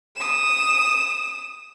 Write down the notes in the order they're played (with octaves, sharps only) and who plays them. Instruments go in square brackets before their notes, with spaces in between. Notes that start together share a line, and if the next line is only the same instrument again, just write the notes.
[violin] D#6 E7